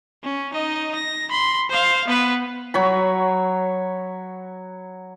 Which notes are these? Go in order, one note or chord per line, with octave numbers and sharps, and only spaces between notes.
C#4
D#4 D#5
A#6
B5 C6
C5 F5
B3 B4
F#3 C#5 B5